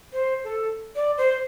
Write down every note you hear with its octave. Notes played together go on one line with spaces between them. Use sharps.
C5
A4
D5
C5